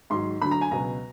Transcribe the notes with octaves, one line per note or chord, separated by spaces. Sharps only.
G#2 D#3 F#3 C6
D2 D3 F#3 B5
A#5
G#5
C#2 B2 F#3 B3 A#5